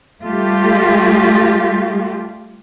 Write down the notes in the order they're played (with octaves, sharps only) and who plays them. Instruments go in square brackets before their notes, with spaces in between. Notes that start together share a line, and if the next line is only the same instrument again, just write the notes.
[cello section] G3 A3 F4 G4